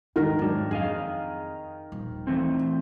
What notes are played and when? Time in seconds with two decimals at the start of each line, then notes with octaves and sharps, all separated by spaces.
0.16 E2 G#2 D#3 A#4
0.39 G#2 F#3 D4
0.71 F2 G#4 D#5 F5
1.92 D#1 A#1
2.27 E3 A3 C4